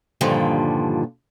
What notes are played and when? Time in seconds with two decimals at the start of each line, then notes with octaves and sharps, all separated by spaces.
0.21 G2 A#2 D3 D#3 F3 G3